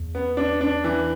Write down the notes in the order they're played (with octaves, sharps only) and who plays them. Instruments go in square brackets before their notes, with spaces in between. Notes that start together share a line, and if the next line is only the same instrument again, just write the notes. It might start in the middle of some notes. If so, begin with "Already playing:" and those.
Already playing: [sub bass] E2
[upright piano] B3
D4
D4
E3